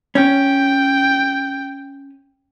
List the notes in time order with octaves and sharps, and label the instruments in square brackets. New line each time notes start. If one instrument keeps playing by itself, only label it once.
[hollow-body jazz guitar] C#4 [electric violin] G5